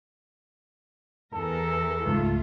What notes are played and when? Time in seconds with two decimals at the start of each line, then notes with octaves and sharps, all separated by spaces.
1.33 E2 A4 A#4
2.06 C#2 G#2 A3 F4